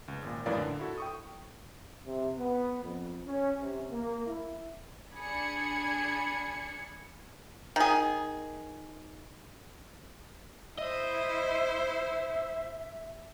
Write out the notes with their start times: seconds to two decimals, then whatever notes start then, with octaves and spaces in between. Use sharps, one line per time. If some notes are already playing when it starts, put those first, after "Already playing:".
0.08 C#2
0.22 G#1 A#2
0.46 F#2 A2 E3 A#4 D5 F5
0.58 D3
0.79 E4 F#4 A4
0.98 G5 C#6 D#6
2.05 C3
2.37 B3
2.83 F2
3.27 C#4
3.60 C3
3.92 A#3
4.27 E4
5.14 D4 G#4 B5 G#6 C#7
7.76 D#3 G#4
10.78 E4 C5 D#5 E5